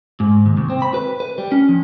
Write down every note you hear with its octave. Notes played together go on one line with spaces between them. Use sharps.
G#2
D#2
C2
C4
B5
B4
B4
G3
C#4
F3